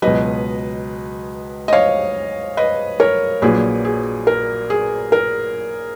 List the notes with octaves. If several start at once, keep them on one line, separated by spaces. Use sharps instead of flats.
C#2 B2 F#3 B4 D#5
D#5
C#5 F5
B4 D#5
A#4 C#5
A#1 A#2 F#3 G#4 B4
G#4
A#4
G#4
A#4